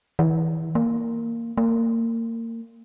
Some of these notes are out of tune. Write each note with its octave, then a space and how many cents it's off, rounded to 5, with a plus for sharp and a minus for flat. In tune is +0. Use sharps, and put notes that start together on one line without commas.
E3 -25
A#3 -10
A#3 -30